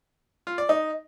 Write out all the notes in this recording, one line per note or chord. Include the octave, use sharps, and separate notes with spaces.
F4
D5
D#4